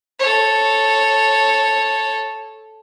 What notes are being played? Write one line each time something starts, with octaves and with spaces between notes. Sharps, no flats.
A4 C#5